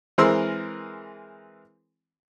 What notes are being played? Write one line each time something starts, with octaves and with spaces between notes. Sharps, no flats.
E3 G#3 C4 A#4 C6 E6